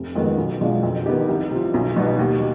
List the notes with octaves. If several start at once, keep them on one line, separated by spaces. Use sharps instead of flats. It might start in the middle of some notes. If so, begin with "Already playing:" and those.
Already playing: F1
F2 D#3 G#3 B3
B1
B2 G#3 D4 F4
F2
D#3 B3 D#4 G4
C2
C3 F3
B1
B2 G3 B3 D#4
D#2